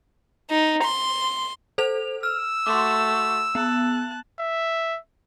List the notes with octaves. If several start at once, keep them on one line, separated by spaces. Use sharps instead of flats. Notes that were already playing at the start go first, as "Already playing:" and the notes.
D#4
C6
A4 C5 F7
E6 F6
A3 F#4 C6 D6
B3 A5 F#6
E5